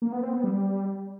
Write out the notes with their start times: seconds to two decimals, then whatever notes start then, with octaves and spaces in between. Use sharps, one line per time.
0.02 A#3
0.12 B3
0.23 C4
0.33 B3
0.44 G3